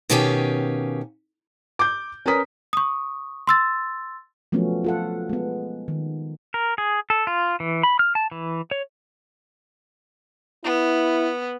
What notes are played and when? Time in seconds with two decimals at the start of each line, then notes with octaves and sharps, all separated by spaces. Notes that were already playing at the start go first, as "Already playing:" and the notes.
0.10 B2 D#3 C#4 G4 F5 G#5
1.79 D6 G6
2.26 C#4 A#4 B4 A#5 D#6 B6
2.73 C#6 D#6
3.47 C6 E6 A6
4.52 F3 F#3 A3 B3 C#4
4.84 F4 A4 F#5
5.29 G#3 B3
5.88 D#3
6.54 A#4
6.78 G#4
7.10 A4
7.27 F4
7.60 E3
7.83 B5
7.99 F6
8.15 A5
8.31 E3
8.71 C#5
10.64 B3 E4